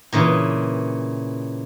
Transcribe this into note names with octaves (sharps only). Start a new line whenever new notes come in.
A#2 C#3 E3